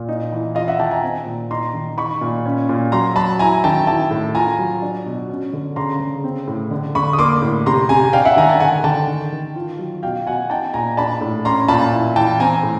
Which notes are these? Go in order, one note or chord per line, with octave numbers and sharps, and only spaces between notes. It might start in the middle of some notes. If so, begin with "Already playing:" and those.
Already playing: A#2
D#4
E3
F4 D#5 F5
E5 F#5
D#3 G5 A5
G#5 A#5
C4
A#2
D#4 A#5 C6
D#3
D#4 B5 C#6
A#2
C#4
A#2
F#3 A#5 C6
F#3 A5 B5
E4 G#5 A#5
D#3 G5 A5
E4 G5 A5
A2
F4 G#5 A#5
F#3
D4
B2
C#4
D3
C#3 A#5 C6
C#3
C4
A2
D3
D3 B5 C#6
D#6
A#3 C6 D6
A2
C3 A#5 C6
C3 G#5 A#5
D4 F5 G5
E5 F#5
D#3 G#5 A#5
G5 A5
D3 F#5 G#5
D3 G5 A5
D#3
D#3
F4
F#3
B2 F5 G5
B2 F#5 G#5
D#4 G5 A5
A#2 G#5 A#5
D4 A5 B5
A2
C#4 A#5 C6
A#2 A5 B5
E4
E3 G5 A5
C4 G#5 A#5
A2